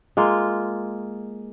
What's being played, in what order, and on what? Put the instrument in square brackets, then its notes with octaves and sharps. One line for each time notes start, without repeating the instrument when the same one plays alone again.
[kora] G#3 A#3 F4